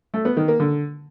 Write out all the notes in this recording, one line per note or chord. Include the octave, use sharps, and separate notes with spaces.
A3
B3
D#3
A#3
D3